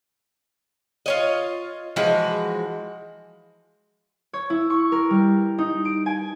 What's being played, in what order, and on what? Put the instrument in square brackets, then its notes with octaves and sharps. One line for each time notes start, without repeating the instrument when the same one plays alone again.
[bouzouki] F4 C#5 D#5
E3 F3 G#3 F#4
[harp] C#5
E4
C#6
A#4
G3
D#4
D7
G#5